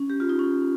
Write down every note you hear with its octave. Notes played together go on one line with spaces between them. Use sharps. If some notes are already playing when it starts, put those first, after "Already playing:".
Already playing: C#4
G4
F4
D#4
C#4